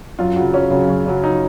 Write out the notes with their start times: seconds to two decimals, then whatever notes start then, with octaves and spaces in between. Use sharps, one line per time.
0.19 F#2 F4
0.36 C#3 F#3
0.54 F#2 C#4
0.71 C#3 F#3
0.89 F#2
1.06 C#3 F#3
1.24 D#4